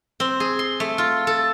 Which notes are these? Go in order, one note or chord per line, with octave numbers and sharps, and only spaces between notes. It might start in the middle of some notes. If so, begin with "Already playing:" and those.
C4
G#4
C6
A3
F4
A4